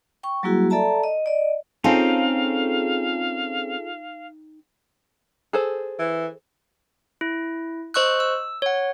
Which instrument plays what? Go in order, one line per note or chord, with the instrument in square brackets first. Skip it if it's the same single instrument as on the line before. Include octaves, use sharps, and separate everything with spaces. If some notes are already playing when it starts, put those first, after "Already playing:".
[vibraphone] G5 C#6
F#3 G3 A#3 E4 F#4 G#4
A4 D5 E5 A5 A#5
D#5
D5 D#5
[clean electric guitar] C4 C#4 [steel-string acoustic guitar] D#4 G5 [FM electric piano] F4 G#4 A4 [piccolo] F5
[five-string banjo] G#4 A4 C5
[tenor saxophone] E3
[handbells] E4
C5 D#5 C#6 E6 F#6
E6
C#5 F#5